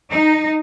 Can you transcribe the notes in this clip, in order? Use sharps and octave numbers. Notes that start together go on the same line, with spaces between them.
D#4